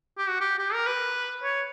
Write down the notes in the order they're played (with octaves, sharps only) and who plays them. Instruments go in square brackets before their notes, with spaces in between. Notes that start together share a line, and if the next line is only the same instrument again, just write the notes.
[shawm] G4
F#4
G4
G4
A#4
B4
C#5